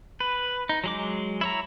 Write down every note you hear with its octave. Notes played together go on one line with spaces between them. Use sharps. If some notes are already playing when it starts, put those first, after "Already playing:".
B4
D#4
F#3 G#3 D6
E4 C#5 A#5